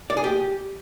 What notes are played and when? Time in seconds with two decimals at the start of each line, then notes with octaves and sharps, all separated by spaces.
0.10 D5
0.17 G#4
0.24 G4